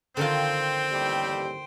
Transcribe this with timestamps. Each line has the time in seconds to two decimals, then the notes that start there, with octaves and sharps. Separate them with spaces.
0.17 D3 D#3 C4 F4 C5 G5
0.91 A1 D#2 G3